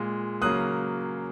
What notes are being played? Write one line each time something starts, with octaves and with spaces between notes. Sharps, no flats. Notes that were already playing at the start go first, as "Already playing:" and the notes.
Already playing: A#2 G#3
C#3 F#3 A#3 D#6 F#6